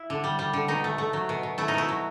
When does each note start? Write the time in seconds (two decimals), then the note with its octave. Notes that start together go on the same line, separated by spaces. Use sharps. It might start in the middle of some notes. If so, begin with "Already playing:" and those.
Already playing: E4
0.10 D3
0.24 G3
0.39 G3
0.53 D3
0.68 B2 D#4
0.84 A3
0.98 A3
1.13 F#3
1.29 B2
1.43 B2
1.58 A3 E4
1.68 D#4
1.74 B2 E4
1.89 F#3